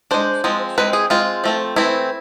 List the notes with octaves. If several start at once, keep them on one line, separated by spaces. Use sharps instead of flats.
G#3 D4 C5
F3 G#3 C4
G#3 C4 B4
G#4
G#3 C4 F4
F3 A3 C4
E3 A3 C4 E4